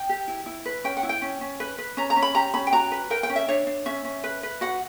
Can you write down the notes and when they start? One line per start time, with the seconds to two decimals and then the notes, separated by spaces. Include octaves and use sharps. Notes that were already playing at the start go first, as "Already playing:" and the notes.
Already playing: G5
0.09 G4
0.28 E4
0.46 E4
0.65 B4
0.84 C#4 G5
0.97 F#5
1.03 E4
1.09 G5
1.22 C#4
1.41 C#4
1.60 B4
1.78 B4
1.97 C#4 A#5
2.10 A#5
2.16 C#4
2.22 B5
2.35 G4 A#5
2.54 C#4 B5
2.67 G5
2.73 F#4 A#5
2.92 B4
3.10 A#4 G5
3.23 G5
3.30 C#4
3.36 E5
3.49 D4 C#5
3.67 D4
3.86 C#4 E5
4.05 C#4
4.24 B4
4.43 B4
4.61 F#4 F#5